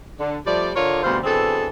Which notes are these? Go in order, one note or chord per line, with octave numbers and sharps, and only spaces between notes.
D3
F3 G3 A3 D5
D3 F4 A4 A#4 C#5 D5
D2 B2 G3 C4 F4 C5
B2 E3 C4 D4 G#4 A4